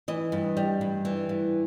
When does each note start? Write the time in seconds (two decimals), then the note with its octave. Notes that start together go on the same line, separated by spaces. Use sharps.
0.08 E3 D#5
0.32 G2
0.57 G3
0.81 G2
1.05 E3
1.29 G2